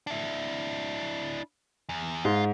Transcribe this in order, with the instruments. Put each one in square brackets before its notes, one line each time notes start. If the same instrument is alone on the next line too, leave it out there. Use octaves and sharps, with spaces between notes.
[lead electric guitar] D4 E4
E2
[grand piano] G#2 [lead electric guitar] F4